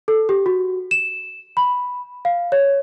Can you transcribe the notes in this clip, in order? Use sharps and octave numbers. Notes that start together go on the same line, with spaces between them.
A4
G4
F#4
E7
B5
F5
C#5